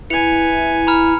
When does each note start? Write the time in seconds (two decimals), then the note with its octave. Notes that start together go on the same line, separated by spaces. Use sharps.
0.10 E4 B4 G#5 C#7 F7
0.87 A#5 B5 F6